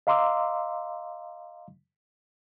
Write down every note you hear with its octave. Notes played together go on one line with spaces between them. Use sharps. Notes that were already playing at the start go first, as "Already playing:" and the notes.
D#5 F5 A#5 C6 D6 E6